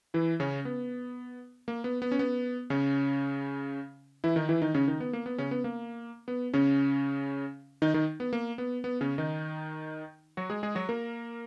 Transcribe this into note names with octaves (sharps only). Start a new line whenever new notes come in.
E3 E4
C#3 C#4
B3
A#3
B3
B3
C#4
B3
C#3 C#4
E3 E4
D#3 D#4
E3 E4
D#3 D#4
C#3 C#4
D#3 D#4
B3
A#3
B3
C#3 C#4
B3
A#3
B3
C#3 C#4
D#3 D#4
D#3 D#4
B3
A#3
B3
B3
C#3 C#4
D#3 D#4
F#3 F#4
G#3 G#4
G#3 G#4
F#3 F#4
A#3 A#4